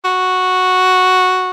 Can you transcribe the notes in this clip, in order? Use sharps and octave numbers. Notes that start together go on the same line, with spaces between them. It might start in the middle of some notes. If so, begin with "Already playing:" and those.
F#4